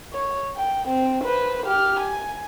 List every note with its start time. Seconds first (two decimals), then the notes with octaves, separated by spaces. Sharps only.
0.13 C#5
0.57 G5
0.88 C4
1.23 B4 C5
1.66 G4 F6
2.00 G#5